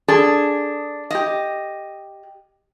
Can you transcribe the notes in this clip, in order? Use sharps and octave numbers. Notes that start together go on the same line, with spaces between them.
D4 G#4 A4
G4 D#5